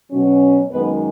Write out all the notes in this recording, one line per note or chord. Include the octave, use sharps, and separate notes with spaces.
B2 F#3 C#4
F#2 D#3 G#3 B3 B4